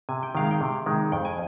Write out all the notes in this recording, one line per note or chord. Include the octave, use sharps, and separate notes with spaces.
C3 G#5
G5
D#3 G#3 F5
G5
C3
D#3 G#3
F2 G5
G#5